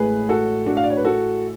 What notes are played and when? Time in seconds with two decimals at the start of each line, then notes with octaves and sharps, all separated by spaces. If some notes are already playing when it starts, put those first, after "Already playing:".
Already playing: A1 A2 G#3 G#4 B4
0.29 F#4 A4
0.66 D4 F#4
0.77 F5
0.84 D5
0.90 C#5
0.97 B4
1.05 F#4 A4